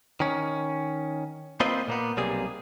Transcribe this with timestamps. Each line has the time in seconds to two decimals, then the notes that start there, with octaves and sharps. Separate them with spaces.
0.20 D#3 C#4
1.60 A#3 C4 F4 B4 C5 D#5
1.88 A#2 A#3 B3
2.17 B1 C3 G3 A#3 G#4